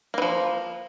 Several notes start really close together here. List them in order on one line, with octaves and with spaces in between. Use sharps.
A#3 E3 F3